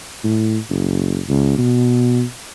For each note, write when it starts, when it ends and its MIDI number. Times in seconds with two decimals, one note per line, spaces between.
0.24 0.58 45
0.69 1.20 30
1.29 1.56 37
1.58 2.22 47